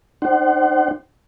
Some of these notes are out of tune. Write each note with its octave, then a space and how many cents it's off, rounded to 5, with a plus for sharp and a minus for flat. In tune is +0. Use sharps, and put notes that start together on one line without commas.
D4 +40 C5 +0 F#5 +40